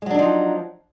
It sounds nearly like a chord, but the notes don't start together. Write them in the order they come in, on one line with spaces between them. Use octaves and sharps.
G#3 F#3 D4 D#4 F3